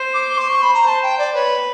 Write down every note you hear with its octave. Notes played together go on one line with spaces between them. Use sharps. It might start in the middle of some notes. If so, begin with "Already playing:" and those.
Already playing: C5
D6
C6
C#6
B5
A#5
C5 A5
G5
D5
B4 C#5